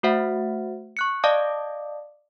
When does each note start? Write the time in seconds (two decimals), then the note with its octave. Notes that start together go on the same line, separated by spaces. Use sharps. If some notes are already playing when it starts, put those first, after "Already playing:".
0.03 A3 F#4 C5 E5 F#5
0.97 C#6 F#6 C#7
1.24 D5 D#5 F5 A5 D6 D#6